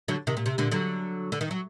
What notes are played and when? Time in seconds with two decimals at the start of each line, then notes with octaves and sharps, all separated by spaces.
0.08 D3 F#3
0.27 C3 D#3
0.37 A#2
0.46 C3
0.58 A#2 D3
0.71 D3 F#3
1.32 D3
1.41 D#3
1.51 F#3